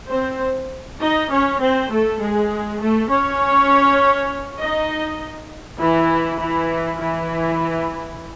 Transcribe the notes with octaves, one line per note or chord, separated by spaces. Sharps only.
C4 C5
D#4 D#5
C#4 C#5
C4 C5
A3 A4
G#3 G#4
A3 A4
C#4 C#5
D#4 D#5
E3 E4
E3 E4
E3 E4